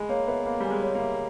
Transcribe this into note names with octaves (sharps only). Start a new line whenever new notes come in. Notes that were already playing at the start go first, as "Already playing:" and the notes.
Already playing: G#3 G#5 B5
A#3 C#5
B3 E5
A#3 B5
G3 G#5
G#3
C#5
A#3
E5